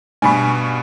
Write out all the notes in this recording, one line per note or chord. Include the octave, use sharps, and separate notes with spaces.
G2 B2 G#5 B5 C#6